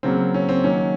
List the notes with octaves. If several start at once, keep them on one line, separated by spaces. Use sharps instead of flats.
C#3 F#3 A#3 C4
C#4
C4
D#3 F#3 A#3 C#4